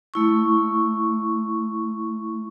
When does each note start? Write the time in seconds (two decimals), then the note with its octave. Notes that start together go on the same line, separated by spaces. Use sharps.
0.14 A3 E4 C#6